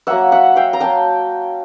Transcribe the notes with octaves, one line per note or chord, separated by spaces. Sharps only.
F#3 A#3 C#4 E5 F#5
E5 F#5
F5 G5
A#5
F#3 A#3 C#4 G5 A5